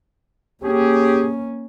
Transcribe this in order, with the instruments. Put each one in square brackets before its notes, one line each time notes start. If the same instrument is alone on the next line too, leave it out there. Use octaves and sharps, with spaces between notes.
[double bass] A#3 C#4 [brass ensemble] G4 G#4